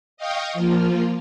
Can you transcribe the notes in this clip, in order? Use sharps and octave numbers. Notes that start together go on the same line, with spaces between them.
D#5 F5 G5 C#6 D#6
F3 A#3 F4